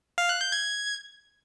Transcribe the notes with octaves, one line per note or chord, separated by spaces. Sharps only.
F5
F#6
G6
G#6